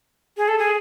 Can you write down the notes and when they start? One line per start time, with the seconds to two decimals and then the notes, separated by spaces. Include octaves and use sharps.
0.37 G#4
0.48 A4
0.59 G#4